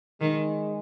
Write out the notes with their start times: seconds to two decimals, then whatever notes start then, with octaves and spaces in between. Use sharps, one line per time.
0.21 D#3 G#3